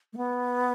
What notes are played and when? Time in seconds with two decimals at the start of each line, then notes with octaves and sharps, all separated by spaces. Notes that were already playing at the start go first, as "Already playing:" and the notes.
0.13 A3
0.17 B3